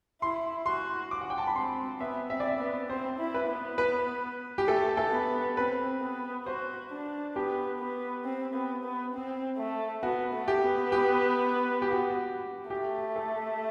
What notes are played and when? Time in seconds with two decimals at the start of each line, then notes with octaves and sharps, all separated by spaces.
0.22 E4 C6
0.66 F#4 C6
1.11 D6
1.21 F#5
1.30 G5
1.38 A5
1.47 B5
1.55 C4 C6
2.00 B3 E5
2.30 C4 E5
2.40 D5
2.49 E5
2.60 B3
2.90 C4 C5
3.19 E4
3.34 B4
3.49 B3
3.78 B4
4.58 G4
4.68 A3 A4
4.97 A4
5.12 B3
5.57 C4 B4
6.01 B3
6.46 F#4 C5
6.91 D4
7.35 B3 G4
7.80 B3
8.25 C4
8.54 B3
8.84 B3
9.14 C4
9.58 A3
10.03 B3 F#4
10.33 A3
10.48 G4
10.63 B3
10.92 G4
11.82 G4
11.91 F#4
12.10 F#4
12.70 A3 G4
13.16 A4